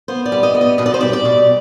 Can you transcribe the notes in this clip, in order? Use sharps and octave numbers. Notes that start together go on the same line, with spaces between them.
B3 C5
D5
G3
D#5
B3
D#5
B2 D#5
D5
C5
G3 D5
D5
B2